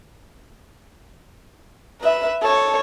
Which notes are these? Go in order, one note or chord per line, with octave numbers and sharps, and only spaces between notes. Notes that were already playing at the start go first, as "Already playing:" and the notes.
B4 E5
A4 C#5